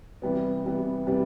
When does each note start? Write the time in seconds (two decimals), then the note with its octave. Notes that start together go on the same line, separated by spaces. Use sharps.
0.22 C3 E3 G3 B3
0.64 C3 E3 G3 B3
1.07 C3 E3 G3 B3